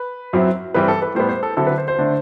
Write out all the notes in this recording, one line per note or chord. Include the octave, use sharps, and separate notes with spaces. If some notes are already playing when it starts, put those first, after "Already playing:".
Already playing: B4
F#2 F#3 C4 E4
G2 E3 G3 C4 B4
A4
B4
A2 G3 B3 C5
C5
A4
D3 F#3 C4 E4 A4
B4
C5
C5
D3 A3 D4